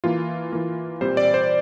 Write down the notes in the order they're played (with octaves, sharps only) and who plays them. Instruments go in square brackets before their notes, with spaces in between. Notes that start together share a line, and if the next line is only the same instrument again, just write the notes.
[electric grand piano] E3 A#3 F4
E3 A#3
A#2 G3 C4 C5
D5
C5